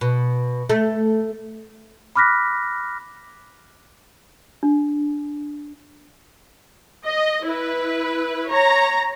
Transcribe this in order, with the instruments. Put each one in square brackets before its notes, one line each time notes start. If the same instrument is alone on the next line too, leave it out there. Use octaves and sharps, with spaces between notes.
[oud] B2
A3
[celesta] B5 D6 F6 F#6 A#6 B6
[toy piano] D4
[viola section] D#5
E4 B4
C#5 A#5